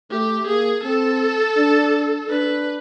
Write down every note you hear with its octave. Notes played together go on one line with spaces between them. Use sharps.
A3 G4
A#3 G#4
C4 A4
D4
D4 B4